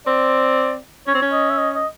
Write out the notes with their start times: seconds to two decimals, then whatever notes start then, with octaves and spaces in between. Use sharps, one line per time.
0.06 C4 D5
1.07 C#4 C#5
1.15 C4
1.22 C#4
1.32 D#5
1.50 E5
1.58 D#5
1.75 D#5